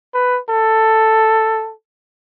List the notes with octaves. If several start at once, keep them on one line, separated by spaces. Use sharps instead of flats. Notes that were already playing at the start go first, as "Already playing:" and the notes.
B4
A4